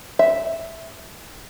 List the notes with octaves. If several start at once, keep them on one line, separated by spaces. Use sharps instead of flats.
E5